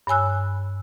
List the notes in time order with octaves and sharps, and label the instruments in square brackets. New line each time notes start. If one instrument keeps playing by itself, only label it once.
[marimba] G2 C#5 G#5 E6 F#6